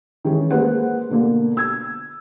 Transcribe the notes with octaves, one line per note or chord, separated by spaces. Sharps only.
D#3 E3 G#3 C#4
G#3 A#3 B4 C5 F#5
B2 D3 A#3
E6 G#6